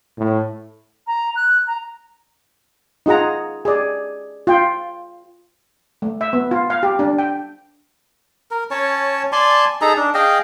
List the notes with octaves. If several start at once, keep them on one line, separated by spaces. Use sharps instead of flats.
A2
A#5
F#6
A#5
D#4 F4 G#4 F#5 A#5
G#4 D5
F4 G5
A3
E5
B3
F4
F5
G4
D4
G5
A#4
C#4 C#5 A5
D5 G#5 A5 C6
D#4 G#4 A4 A#5
D4
G#4 D#5 F5 G5